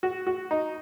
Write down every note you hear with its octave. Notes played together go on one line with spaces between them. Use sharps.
F#4
F#4
D#4